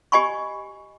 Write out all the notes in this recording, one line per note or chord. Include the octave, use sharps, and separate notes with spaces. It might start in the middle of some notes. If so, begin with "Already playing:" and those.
G4 D#5 G#5 B5 C#6